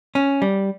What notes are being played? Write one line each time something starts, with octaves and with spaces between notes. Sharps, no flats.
C#4
G3